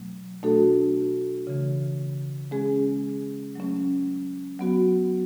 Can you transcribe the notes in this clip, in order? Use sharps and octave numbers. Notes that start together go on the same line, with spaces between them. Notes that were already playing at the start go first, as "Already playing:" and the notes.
Already playing: B2 F#3 A3
B2 A3 D4 F#4 A4
C#3 E3 A3
G#3 C#4 G#4
F#3 A3 C#4
F#3 B3 F#4